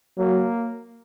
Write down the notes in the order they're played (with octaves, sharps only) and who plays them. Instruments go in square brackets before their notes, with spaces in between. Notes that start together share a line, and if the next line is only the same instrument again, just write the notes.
[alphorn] F#3 [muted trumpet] A#3